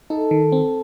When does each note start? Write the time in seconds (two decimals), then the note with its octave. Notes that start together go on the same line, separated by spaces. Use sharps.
0.10 D#4 A4
0.31 D#3
0.52 C4